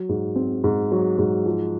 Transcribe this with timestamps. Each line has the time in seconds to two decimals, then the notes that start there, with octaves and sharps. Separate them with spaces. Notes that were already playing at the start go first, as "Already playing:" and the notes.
Already playing: F#3
0.09 G#2
0.36 C4
0.64 G#2
0.92 F#3
1.18 G#2
1.46 F3